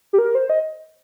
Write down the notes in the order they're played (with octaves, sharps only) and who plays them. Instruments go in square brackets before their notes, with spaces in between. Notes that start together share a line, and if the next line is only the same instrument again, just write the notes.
[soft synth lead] G4
A#4
C5
D#5